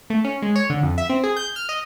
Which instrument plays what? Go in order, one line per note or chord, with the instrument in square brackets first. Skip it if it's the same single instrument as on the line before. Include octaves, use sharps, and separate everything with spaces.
[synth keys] A3
C#4
G#3
C#5
D3
F2
E5
C4
G#4
G6
F6
D#5